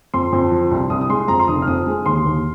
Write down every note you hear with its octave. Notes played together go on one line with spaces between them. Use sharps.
F2 C6
F2
F3
C2
C2 D#6
D#6
G#3 C6
F2 A#5
C6
F1 D#6
F6
F2 D#6
G#3
D#2 C6
D#2